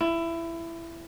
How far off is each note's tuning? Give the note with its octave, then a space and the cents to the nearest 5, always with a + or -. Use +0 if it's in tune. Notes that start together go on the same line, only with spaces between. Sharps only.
E4 +20